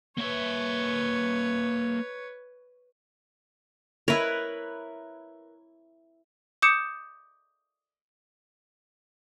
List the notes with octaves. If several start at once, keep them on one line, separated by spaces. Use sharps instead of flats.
A#3 B4 C#5 E5
E4 A#4 B4 C#5
D6 D#6 G6 C#7 E7